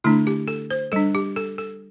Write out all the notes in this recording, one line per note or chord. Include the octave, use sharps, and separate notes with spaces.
D3 A3 D4 E4
G4
A4
C5
G3 D4 A4
G4
A4
A4